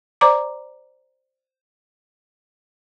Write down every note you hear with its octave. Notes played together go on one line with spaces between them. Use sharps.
C5 D5 A#5 D6